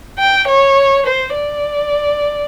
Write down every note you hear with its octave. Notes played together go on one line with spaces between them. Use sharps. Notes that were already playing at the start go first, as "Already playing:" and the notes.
G5
C#5
C5
D5